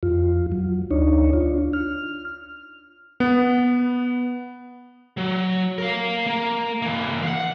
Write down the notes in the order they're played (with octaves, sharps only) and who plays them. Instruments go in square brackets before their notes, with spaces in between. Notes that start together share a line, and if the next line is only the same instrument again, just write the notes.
[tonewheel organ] F2 F4
F#3
D2 D4 D#4 C#5
D4 F4
F6
[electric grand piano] B3
[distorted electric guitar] F#3
A#4 F5
A#3
E3 A#3
F5 F#5